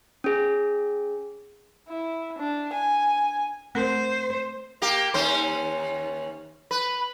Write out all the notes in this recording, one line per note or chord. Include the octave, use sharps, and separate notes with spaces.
C#4 G#4
E4
D4
G#5
A3 C4 A#4 C5
A#3 G4
D#2 C#4 C5
B4